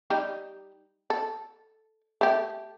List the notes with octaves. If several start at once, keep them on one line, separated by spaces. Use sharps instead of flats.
G3 D#4 G4
A4
A3 G4